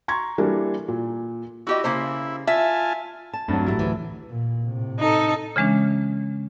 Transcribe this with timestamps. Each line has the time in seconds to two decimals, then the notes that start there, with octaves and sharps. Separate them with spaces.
0.08 A#5 C6 C#6 G#6
0.38 E3 G3 A#3 D4 A4 A#4
0.88 A#2
1.67 E4 F#4 G4 D#5
1.84 C#3 A#3 C5
2.47 F4 E5 G#5 A5
3.33 A5
3.48 G2 F#3 A3 C4 A6
3.67 A1 A2 F#3 E4 G4 A6
3.79 D2 E3
4.30 A#2
4.65 A2 C3
5.00 D#4 A4
5.56 C#3 E3 G#3 C#4 D4